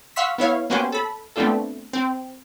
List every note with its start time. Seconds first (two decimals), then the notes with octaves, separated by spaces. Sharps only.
0.16 F5 F#5 C6 C#6 E6 B6
0.38 B3 E4 C#5 F5
0.70 A#3 B3 C#4 F#4 G4 C5
0.92 A4 B5
1.36 A3 B3 C4 D4 F4 A4
1.93 C4